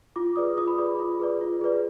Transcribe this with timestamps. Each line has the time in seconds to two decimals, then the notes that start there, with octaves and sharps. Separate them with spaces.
0.16 F4 D6
0.36 G#4 B4 D5 D#6
0.57 F4 D#6
0.68 B5
0.78 G#4 B4 D5 D6
0.99 F4
1.20 G#4 B4 D5
1.41 F4
1.61 G#4 B4 D5